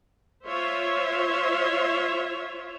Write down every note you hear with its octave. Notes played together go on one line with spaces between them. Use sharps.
F4 C5 C#5 E5